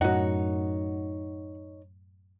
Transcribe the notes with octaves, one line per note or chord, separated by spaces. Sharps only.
F#2 A2 D#4 F#4 A#4 C#5 F#5